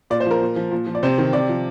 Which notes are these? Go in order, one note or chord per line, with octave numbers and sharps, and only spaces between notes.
A#2 D5
C5
F3
A#4
A#2
F3
A#2
F3
D5
C3 C5
D#3
C3 D5
F3